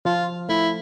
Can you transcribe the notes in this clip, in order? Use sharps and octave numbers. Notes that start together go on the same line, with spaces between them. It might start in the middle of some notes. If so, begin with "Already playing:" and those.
F3 F4
A3 E4